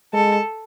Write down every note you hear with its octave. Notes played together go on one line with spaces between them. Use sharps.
G#3 A4